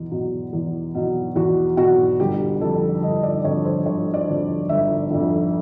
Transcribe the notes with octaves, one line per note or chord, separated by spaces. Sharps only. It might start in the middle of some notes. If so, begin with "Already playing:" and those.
Already playing: E2 B2
B2 F#3
E2
B2 F#3
E2 F#4
B2 F#3 F#4
G1 G4
F2 D3 A4
G1 D#5
D5
F2 D3 C#5
C5
G1 C#5
D5
F2 D3
G1 E5
F2 D3